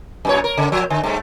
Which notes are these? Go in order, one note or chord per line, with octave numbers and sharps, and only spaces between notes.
F#2 A#2 C#5
A#4
C#3
F3
D3
G2 A3